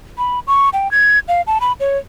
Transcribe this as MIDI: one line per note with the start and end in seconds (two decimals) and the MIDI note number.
0.18 0.40 83
0.47 0.69 85
0.73 0.90 79
0.91 1.19 92
1.28 1.42 77
1.47 1.58 81
1.61 1.73 83
1.80 1.98 73